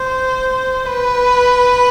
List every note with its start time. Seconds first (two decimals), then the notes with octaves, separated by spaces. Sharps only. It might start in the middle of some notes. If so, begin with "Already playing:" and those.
Already playing: C5
0.85 B4